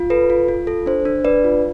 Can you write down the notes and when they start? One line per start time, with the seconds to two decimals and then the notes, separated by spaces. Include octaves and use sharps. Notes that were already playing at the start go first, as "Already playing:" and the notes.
Already playing: F4
0.10 A4 B4
0.30 F4
0.48 F4
0.67 A4
0.86 D4 C5
1.05 D4
1.24 D4 B4 D5
1.44 F4